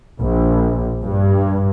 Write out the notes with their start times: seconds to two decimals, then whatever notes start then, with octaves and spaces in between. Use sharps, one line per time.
0.21 A#1
1.02 G2